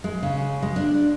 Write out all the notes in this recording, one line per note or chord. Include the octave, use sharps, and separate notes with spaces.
G#3
C#3
G#3
D4